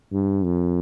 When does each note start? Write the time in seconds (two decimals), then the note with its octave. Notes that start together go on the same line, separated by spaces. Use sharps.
0.12 G2
0.44 F2